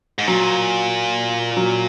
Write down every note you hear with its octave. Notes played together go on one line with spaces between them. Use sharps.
G#2
A#2 F#3
F#3